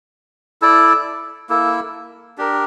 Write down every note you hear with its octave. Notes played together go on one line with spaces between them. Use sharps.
E4 A4 D5
A#3 E4 A4
D4 G4 A#4